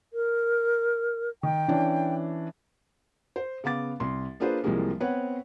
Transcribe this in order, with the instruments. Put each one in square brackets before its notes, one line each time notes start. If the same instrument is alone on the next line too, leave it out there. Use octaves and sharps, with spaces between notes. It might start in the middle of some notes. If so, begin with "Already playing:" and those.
[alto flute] A#4
[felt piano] D#3 [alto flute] G5
[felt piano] E3 C#4 D4
C5
C#3 B3 F5 D6 A6
C2 C6
A#3 D4 F4 G#4 B4 C5
C2 E3 F3 G3 G#3 A#3
B3 C4 B4 C#5 F#5